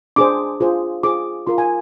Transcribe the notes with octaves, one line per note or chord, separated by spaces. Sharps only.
D4 G#4 C5 D6
F4 G#4 C5
F4 G#4 C5 D6
F4 A#4 C6
G#5